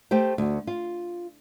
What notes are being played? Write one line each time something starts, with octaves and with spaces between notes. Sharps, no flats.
A3 G4 C5 G5
D2 F#4
F4